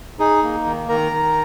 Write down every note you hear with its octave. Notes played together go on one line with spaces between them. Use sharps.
D#4 G#4
A#3
D#3
D#3 A#4 A#5
D#3